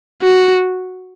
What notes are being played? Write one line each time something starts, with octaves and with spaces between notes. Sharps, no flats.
F#4